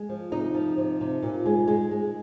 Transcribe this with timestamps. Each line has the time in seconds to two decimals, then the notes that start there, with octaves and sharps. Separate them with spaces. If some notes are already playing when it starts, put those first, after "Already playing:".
Already playing: G#3
0.09 F3
0.31 C3 D#4
0.54 F3
0.78 C3
1.01 C3
1.22 A#2
1.46 G#3
1.68 G#3
1.91 G#3